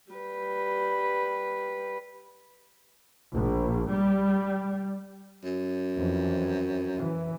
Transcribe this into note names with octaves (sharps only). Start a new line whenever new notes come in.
G3 B4
A#1
G3
F#2
F2 E3
E3